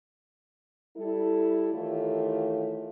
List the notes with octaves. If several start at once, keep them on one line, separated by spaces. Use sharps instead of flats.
G3 E4 A4
D#3 E3 A3 F4 G4 C#5